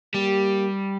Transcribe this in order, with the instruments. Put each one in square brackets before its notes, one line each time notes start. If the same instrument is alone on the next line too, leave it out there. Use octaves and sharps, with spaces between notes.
[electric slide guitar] G3 [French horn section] A#3 G4